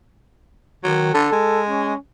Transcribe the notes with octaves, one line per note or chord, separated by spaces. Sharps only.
D#3 F#3
D3 A4
G#3
C#4